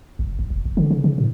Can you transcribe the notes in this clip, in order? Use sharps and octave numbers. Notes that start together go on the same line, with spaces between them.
F#1
F#1
E1
F1
D3
C#3
C#3
A2